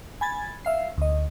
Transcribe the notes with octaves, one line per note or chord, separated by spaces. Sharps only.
G#5 B5 G#6 A6
E5 F5 C7
D2 D#5